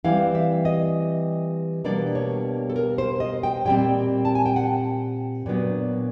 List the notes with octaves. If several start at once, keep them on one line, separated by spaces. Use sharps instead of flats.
E3 G3 C4 E4 F5
E5
D#5
B2 G3 A#3 D4 D5
C#5
A4
A#4
C5
D#5
G5
A#2 G3 C4 G5
A5
G#5
G5
F#5
A#2 F#3 B3 D4